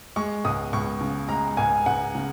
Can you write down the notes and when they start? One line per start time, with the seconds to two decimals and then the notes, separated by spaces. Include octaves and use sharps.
0.16 G#3 C#6
0.45 C#2 D#6
0.73 C#2 C#6
1.01 C#3
1.29 G#3 A#5
1.57 C#2 G#5
1.86 C#2 F#5
2.15 C#3